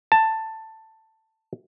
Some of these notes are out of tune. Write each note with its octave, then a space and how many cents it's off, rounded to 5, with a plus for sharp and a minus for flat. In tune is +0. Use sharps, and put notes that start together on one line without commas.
A5 +10